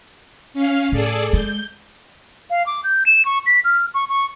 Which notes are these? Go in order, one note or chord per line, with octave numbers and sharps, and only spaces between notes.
C#4 F5
A2 G#4 A4 D5
G#3 G6
F5
D6
G6
E7
C#6
B6
F6
C#6
C#6